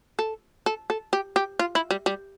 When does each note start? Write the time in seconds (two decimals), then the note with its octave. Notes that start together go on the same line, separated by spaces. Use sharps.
0.19 A4
0.66 A4
0.90 A4
1.13 G4
1.36 G4
1.59 F4
1.75 E4
1.91 G3
2.06 G3